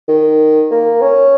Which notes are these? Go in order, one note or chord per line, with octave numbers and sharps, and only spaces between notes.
D#3
A#3
C#4